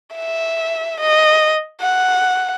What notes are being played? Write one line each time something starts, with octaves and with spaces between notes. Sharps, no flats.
E5
D#5
F#5